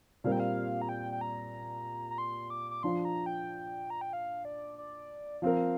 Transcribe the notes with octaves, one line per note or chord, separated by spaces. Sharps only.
A#2 G3 C4 A#4 F5
G5
F5
A#5
G5
G5
A#5
A#5
C6
D6
D6
F3 D4 F4 C6
A#5
G5
A#5
G5
F5
D5
D5
F3 C4 A#4 F5